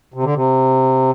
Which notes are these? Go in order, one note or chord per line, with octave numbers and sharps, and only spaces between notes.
C3
D3
C3